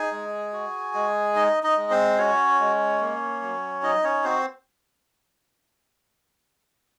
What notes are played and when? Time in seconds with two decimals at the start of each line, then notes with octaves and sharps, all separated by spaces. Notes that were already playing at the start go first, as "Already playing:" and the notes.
Already playing: D#4 G#4 G#5
0.11 G#3
0.53 F#4
0.94 G#3
1.36 D#4 D#5
1.63 D#4 D#5
1.77 G#3
1.90 C4 C5
2.18 C#4 F#4 C#5
2.60 G#3
3.01 A#3
3.42 F#3
3.83 D#4 D#5
4.04 C#4 C#5
4.24 C4 F#4 C5